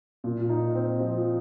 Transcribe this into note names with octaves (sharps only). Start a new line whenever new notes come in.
A#2
D#4
C4
F3